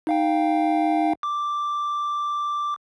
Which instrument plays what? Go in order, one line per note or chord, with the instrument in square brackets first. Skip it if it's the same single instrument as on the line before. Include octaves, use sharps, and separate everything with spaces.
[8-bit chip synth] D#4 F5 G5
D6